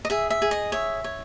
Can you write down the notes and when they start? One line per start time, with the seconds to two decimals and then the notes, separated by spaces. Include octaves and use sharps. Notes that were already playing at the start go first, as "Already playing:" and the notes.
0.05 D#5
0.10 G#4 E5
0.30 E5
0.42 G#4
0.51 D#5
0.72 C#5 E5
1.04 C#5